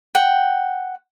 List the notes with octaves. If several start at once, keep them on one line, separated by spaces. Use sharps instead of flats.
F#5 G5